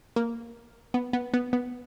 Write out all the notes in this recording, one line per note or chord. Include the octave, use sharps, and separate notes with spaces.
A#3
B3
B3
B3
B3